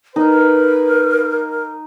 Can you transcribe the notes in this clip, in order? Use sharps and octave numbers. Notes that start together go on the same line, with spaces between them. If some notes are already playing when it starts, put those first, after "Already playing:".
D#4 A#4 B4